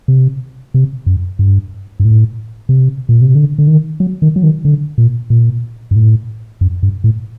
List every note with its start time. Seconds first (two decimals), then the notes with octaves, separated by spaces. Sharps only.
0.08 C3
0.74 C3
1.06 F#2
1.39 G2
2.00 G2
2.05 A2
2.69 C3
3.09 A#2
3.21 C3
3.35 D3
3.58 D3
3.67 D#3
4.00 F#3
4.22 D#3
4.36 F#3
4.43 D#3
4.65 D3
4.98 A#2
5.30 A#2
5.91 G2
5.96 A2
6.61 F#2
6.83 G2
7.04 A2